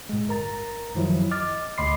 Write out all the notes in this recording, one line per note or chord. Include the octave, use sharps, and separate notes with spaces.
A2 G#3
G1 A#4 A#5 A6
F#2 D#3 F3 F#3 E4
D#5 D6 F6 A6
D2 D#5 B5 C6 D6 C7